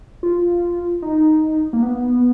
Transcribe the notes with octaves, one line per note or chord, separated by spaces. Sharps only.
F4
D#4
A#3
B3